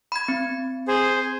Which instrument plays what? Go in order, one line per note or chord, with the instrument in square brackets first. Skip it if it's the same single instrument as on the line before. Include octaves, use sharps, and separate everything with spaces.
[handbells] B5 G#6
C4
[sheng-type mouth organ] G#4 C5